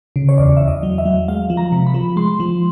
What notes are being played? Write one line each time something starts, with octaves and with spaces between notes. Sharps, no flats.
C#3
C#5
E2 D5
E2 E5
D#5
F#3
E5
F#3
G#3 F5
F3
A#5
C3
B5
F3
G#3 C6
F3